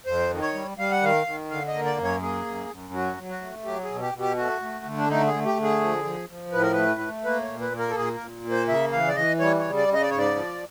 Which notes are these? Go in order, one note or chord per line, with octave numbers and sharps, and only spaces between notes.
F2 C5
D#3
C#5
G3
G3 F5
F#5
D#3 F5
D#3
D3 F5
D#5
A#3
D5
F#2
C#5
A#3 G#4
F#2
F#2
F#3 F#4
F#3
F#4
A3
F#3 G4
G#4
B2
G4
B2
G4
A3 F#4
A3
D3
D4
A3 D#4
G#4
A3
G4
D3
G#4
F3
F3
F3
A2 B4
A#4
A3 B4
A3
A#3 B4
C#5
A#2
B4
A#3
A#4
A4
A#2 G#4
A#4
A#2
A#3
C5
C#3 E5
E3 F5
D5
E3 D#5
G3 C#5
C#5
C#3
D5
C#3
D#5
D5
G#2 C#5
D5
F3